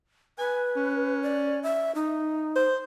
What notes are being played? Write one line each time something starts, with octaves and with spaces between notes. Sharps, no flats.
B4 G#5
C#4
D5
E5
D#4
C5